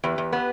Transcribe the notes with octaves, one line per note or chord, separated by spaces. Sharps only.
E2 G4 B4
E2
B3 G4 B4